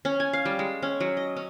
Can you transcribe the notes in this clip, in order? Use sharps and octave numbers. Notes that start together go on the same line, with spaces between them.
C#4
G#5
F5
G3
G#3
C#4
F#3
D#5
C#4